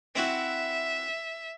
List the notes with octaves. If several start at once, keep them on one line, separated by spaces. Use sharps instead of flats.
C4 E4 F#4 E5